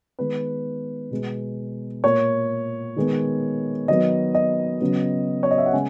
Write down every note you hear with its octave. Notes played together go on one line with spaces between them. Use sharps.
D#3 G#3 B3 B4
B2 G#3 B3
A#2 A#3 C#5
D#3 G#3 B3
D#3 F#3 B3 D#5
D#5
C#3 F#3 B3
C#5
D#5
E5
F#5
C#3 G#3 B3 G#5